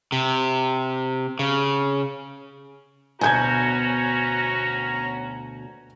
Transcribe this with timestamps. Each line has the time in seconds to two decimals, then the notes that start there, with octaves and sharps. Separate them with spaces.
0.12 C3
1.39 C#3
3.21 D2 B2 C#4 F#4 G#5 A#5 G6 G#6